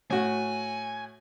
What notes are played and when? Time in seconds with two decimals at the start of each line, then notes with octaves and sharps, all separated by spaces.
0.10 A2 F#4 G#5